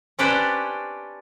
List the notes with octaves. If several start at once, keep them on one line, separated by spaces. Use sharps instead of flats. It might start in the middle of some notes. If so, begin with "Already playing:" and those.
C#4 D4 G4 B4 C5 D5